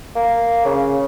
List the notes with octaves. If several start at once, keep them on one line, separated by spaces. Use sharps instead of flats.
A#3
C#3